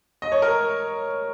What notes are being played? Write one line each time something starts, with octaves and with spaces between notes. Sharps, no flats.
D#5
C#5
A#4